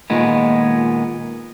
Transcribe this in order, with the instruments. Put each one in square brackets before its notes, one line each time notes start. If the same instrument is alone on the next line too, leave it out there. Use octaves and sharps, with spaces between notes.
[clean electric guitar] A#2 D#3 G#3 B3